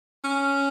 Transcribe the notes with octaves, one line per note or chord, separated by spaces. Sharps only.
C#4